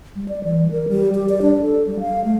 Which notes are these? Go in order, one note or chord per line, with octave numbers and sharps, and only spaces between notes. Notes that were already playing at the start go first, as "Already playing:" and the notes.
G3
D5
E3
A#4
G3
G4
D5
D4
A4
G3
F5
A3